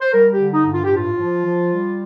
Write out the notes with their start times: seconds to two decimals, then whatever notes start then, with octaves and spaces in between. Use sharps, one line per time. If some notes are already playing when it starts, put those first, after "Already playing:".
0.01 C5
0.13 G3 A#4
0.32 G4
0.39 D3
0.53 D#4
0.66 G2
0.73 F4
0.84 G4
0.92 A2 F4
1.19 F3
1.45 F3
1.72 G3